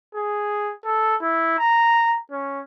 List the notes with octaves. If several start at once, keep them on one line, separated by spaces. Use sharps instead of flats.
G#4
A4
E4
A#5
C#4